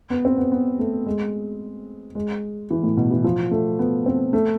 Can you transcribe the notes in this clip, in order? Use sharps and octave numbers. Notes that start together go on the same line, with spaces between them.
B3
C4
B3
B3
A3
G#3
G#3
E3
A2
B2
E3
F3
A3
B3
C4
A3